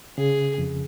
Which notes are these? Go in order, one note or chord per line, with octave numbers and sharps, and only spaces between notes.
C#3 G#4
F2